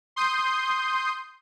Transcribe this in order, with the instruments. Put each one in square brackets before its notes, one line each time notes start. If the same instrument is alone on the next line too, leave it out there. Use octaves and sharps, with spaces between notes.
[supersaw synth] C6 D#6 G6